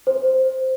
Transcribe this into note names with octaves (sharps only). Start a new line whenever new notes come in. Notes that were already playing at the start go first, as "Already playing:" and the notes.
C5